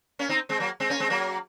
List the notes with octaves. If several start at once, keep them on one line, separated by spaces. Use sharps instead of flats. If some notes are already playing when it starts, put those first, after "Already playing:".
A#3 C#4
C4 D#4
G#3 C4
F#3 A#3
G#3 C4
A#3 C#4
G#3 C4
F#3 A#3